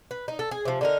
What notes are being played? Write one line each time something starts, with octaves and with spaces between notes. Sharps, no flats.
B4
D#4
A4
G#4
C3 F3
D3 D#4 A#4